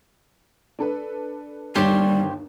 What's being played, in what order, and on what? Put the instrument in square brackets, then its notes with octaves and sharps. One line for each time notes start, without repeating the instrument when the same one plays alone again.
[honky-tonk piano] D4 A4 B4
[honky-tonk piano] G1 D#2 E7 [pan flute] G3 [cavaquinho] G4 C5 C#5